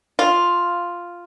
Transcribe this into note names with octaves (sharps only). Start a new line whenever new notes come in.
F4